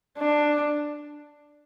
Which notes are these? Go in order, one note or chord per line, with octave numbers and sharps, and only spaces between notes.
D4